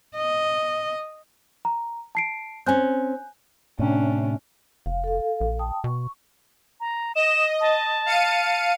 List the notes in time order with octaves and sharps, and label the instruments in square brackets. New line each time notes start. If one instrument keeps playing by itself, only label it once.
[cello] D#5
[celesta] A#5
A5 C7 D7
[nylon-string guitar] C4 C#4 [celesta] G#5 F#6 G6
[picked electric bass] A2 C3 [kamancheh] C#4 D4
[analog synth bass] F1 [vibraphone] F5
[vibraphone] A4 F5
[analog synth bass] A#1
[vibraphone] G5 A5 D#6
[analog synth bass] B2 [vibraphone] C#6
[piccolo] A#5
[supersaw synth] D#5 [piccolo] E7
[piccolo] A5
[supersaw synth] F5 C#7 D#7